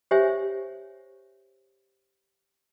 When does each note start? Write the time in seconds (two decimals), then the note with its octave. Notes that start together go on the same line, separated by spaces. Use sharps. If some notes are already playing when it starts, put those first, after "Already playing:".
0.11 G4 C5 C#5 E5 G#5